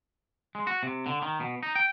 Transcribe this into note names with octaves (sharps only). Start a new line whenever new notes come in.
G#3
F#4
C3
D3
D#3
B2
D#4
G5